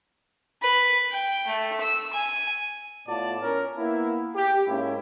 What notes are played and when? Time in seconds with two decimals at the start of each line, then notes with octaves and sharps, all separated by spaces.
0.62 B4
1.11 G5
1.47 A3
1.80 E6
2.13 G#5
3.08 A2 B3 F4 D5 A5
3.42 C#4 A#4
3.78 A#3 B3 E4
4.35 G4
4.67 G#2 A#3 C#4 E4